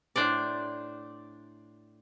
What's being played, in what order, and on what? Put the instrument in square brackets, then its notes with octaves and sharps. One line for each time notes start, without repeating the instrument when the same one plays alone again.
[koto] A2 D4 C5 D5